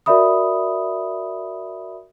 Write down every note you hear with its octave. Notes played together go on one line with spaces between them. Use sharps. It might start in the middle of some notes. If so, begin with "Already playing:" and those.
F#4 A#4 D5 E5 B5 D#6